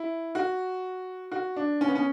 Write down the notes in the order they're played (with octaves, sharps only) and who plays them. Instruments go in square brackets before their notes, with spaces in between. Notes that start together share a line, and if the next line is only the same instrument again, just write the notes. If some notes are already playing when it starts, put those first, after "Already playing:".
Already playing: [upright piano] E4
F#4
F#4
D4
C#4
B3
C#4